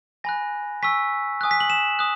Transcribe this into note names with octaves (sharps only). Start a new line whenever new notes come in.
G#5 B5 F#6 A#6
G#5 C#6 E6 B6
G#5 D#6 F#6
B6
F#7
E7
D#6 F#6